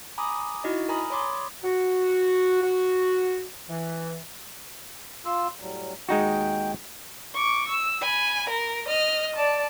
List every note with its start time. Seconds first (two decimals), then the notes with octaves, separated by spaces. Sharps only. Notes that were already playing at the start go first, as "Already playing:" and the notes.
0.18 G#5 A#5 B5 D6 D#6
0.64 D#4 E4 F#4 D5 D#5
0.89 A#4 G#5 A#5 B5 D#6
1.10 C#5 D5 B5 C6 D6 D#6
1.64 F#4
2.62 F#4
3.68 E3
5.26 F4 C6 E6
5.60 A2 F#3 G3
6.09 D#2 G#3 D#4 F#4 G5
7.34 C#6 D6
7.68 E6
8.01 G#5 B5
8.49 A#4
8.88 D#5 F6
9.36 D5 A5